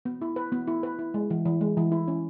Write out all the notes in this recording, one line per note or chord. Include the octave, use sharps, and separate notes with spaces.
B3
E4
B4
B3
E4
B4
E4
G#3
E3
E3
G#3
E3
E4
C#4